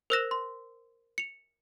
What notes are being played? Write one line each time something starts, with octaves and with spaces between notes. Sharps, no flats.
A#4 C5 E6 F#6 A#6 E7
C6
C#7 F7